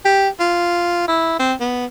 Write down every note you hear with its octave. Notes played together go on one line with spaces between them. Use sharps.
G4
F4
E4
C4
B3